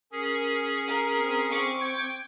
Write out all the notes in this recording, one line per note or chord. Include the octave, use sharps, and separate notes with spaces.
C#4 G#4 A#4
A#4
C4
C4 C#6 D6
G5 G6 G#6